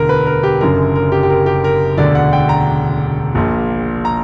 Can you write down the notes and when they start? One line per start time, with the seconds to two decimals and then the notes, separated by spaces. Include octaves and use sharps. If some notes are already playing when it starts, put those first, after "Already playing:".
Already playing: E1 D2 D3 A#4
0.09 B4
0.26 A#4
0.43 G4
0.60 F#1 F#2 D3 A#4
0.96 A#4
1.12 G4
1.23 G4
1.30 A#4
1.46 G4
1.64 A#4
1.98 E1 D2 D3 D5
2.15 F#5
2.33 G5
2.49 A#5
3.35 A#1 A#2
4.05 A#5